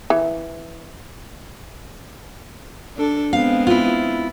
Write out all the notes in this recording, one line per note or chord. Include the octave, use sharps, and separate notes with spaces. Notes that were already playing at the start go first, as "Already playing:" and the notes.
E3
D4 A4
G#3 B3 C4 F5
E4 F4